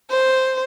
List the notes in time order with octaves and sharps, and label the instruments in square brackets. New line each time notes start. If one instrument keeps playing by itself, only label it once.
[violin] C5